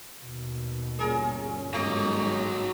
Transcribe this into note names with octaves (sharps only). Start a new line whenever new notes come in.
D#2 B2
G1 A#2 C#4 G#4 A#4
G#1 G#2 F#3 G3 D#5